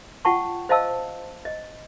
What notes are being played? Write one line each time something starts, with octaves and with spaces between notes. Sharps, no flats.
F4 F#5 G5 A5 C#6
C5 D#5 F5 A5 E6
D#5